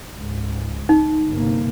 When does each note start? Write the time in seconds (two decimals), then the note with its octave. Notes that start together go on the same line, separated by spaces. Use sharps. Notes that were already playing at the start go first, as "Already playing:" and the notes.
0.13 C#2 G#2
0.89 D#4
1.27 G1 C3 A#3